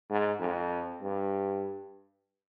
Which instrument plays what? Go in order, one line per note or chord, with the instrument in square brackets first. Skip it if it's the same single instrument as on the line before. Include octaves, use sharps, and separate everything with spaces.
[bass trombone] G#2
F2
G2